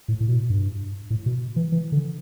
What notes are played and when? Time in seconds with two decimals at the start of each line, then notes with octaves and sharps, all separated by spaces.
0.08 A2
0.20 A2
0.29 B2
0.50 G2
1.10 A2
1.26 B2
1.56 E3
1.72 E3
1.92 D3